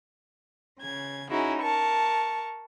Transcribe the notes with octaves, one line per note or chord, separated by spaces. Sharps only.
C#3 G#6
C#4 D#4 E4 F#4 G#4
A#4 A5 C#6